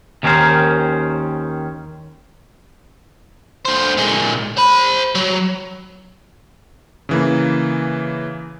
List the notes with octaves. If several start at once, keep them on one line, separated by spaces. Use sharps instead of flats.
D#2 D#3 C#4 F#4 A#4 C5
D3 C5
A#2 G#3
C5 B5
F#3
C#3 E3 A#3